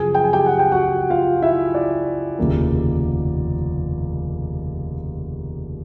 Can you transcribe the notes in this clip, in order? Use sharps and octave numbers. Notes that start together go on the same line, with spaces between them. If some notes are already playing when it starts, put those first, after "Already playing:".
Already playing: F#2 C#3 F3 G#4 G#5
G5
G#5
G4 G5
F#5
G5
F#4 F#5
F4 F5
E4 E5
D5
F1 D#2 C#3 F3 A#3